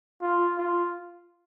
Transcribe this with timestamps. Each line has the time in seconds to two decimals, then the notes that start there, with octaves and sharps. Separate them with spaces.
0.22 F4
0.58 F4